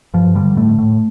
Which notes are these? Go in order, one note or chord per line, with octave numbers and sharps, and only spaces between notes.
G2 F3
D3 G3
A2 A3
A2